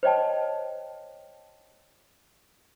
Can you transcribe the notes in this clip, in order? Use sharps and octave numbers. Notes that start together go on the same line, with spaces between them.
C5 C#5 D#5 G5 A5